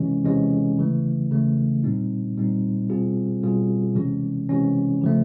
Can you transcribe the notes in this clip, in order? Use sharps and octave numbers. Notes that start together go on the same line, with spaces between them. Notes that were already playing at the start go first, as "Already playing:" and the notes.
Already playing: C3 E3 G#3 C#4
C3 E3 G#3 C#4
C#3 E3 A3
C#3 E3 A3
A#2 G3 C4 D#4
A#2 G3 C4 D#4
B2 G3 C4 F4 G#4
B2 G3 C4 F4 G#4
C3 E3 G#3 C#4
C3 E3 G#3 C#4
C#3 F3 A3